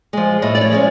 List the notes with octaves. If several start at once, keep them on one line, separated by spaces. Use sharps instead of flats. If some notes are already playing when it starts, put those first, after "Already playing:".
F3 G#3
A2 D#5
D5
C#5
F3 G#3 C#4